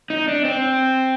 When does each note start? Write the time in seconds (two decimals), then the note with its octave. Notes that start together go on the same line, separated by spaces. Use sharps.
0.10 D#4
0.28 D4
0.45 C4